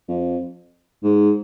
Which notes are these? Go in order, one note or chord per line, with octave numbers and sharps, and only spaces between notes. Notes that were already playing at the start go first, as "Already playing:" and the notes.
F2
G#2